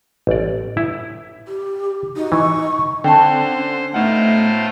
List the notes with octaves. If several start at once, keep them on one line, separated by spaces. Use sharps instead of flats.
A1 D5
E4
G4
D#4 F#4
E3 C#6
D3 C4 C5 G5 A5
C#4
A2 A3 B3 D#4 F4 C5 F#5